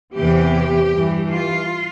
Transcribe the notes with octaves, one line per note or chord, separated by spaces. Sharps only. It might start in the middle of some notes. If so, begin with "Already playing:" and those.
E2 C3 E3 G4
G2 E3
F4